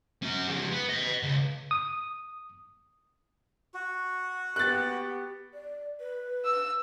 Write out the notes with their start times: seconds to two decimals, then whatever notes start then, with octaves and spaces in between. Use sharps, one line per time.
0.23 C#4 F#4
0.48 F3 G#3
0.72 B3
0.90 D#5 F#5
1.23 C#2
1.71 D#6
3.74 F#4
4.56 B3 G4 F#6 A6
5.54 D5
6.00 B4
6.45 E6